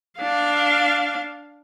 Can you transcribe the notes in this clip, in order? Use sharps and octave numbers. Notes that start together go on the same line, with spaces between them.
D4 F5